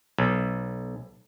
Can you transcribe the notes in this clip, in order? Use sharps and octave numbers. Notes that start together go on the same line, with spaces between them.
B1